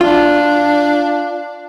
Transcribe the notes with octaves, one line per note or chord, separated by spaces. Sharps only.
D4 F4